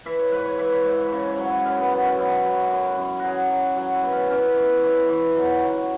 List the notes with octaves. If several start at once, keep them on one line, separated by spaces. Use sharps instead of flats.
E3 E5
C#5
G#2 B4
C#5
E3 E5
C#5
G#2 C#5
E5
C#3 C#5
C#5
F#3
E4
F#2 C#4
B3
F#3 B3
C#4
F#2 E4
F#3
F#2
F#2
F#3 F#4 G#4
F#3
F#3 F#4
E4
B2
C#4
E3 C#4
E3
E3 C#5
E3
F#3
F#3